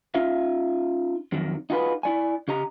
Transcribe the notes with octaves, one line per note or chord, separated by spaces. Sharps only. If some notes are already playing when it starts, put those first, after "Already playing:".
C#4 D#4 F4 E5 F5
F2 D#3 F#3
D#4 F4 F#4 G#4 A#4 B4
E4 D5 G#5
C#3 G4 D#5 A#5